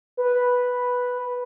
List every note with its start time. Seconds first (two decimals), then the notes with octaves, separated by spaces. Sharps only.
0.17 B4